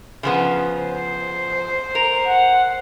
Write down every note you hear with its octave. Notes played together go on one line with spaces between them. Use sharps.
C#3 F3 B3
C5
A#4 F7
F#5